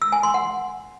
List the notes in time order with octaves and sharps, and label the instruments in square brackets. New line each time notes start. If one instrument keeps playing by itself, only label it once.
[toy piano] E6
G#5
C6
F#5